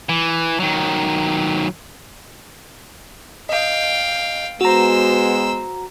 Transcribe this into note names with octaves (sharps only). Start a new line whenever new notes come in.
E3
D#3 F#3
D#5 F5 G5
G#3 B3 F#4 C5 A#5 E6